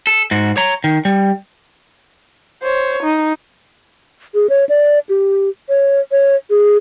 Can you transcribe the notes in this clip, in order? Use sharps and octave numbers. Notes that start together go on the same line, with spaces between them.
A4
G#2 F#4
C#5 A#5
D#3
G3
C5 C#5
D#4
G#4
C#5
D5
G4
C#5
C#5
G#4